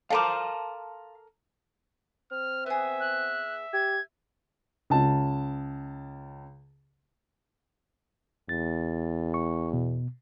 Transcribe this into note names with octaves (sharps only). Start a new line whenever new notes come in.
A4 A#4 F5 A5 C6 D6
C4 F6
B3 G#4 E5
F#6
G4 G#6
C#2 A5
E2 A6
C#6
B2